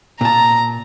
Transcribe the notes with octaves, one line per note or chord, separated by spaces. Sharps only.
A#2 A5 A#5